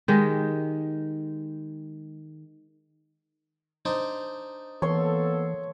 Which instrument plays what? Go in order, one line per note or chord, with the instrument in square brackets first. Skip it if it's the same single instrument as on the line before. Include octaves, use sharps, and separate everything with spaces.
[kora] D#3 G#3 G4
[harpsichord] D4 D#4 C5
[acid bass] E3 [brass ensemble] A#3 B3 A4 [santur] C#5 C6